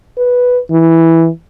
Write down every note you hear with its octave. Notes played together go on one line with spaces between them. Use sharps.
B4
E3